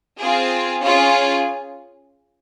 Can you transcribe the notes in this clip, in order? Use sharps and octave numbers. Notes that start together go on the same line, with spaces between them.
C4 F4 G#4
C#4 F4 G#4